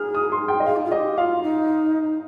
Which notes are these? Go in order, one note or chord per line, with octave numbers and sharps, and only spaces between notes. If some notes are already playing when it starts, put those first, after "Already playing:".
Already playing: G#4 F6
D#6
C6
G5
D#5
G#4 F5
D#4
F4
G#4 D#5
G4
F4 F5
D#4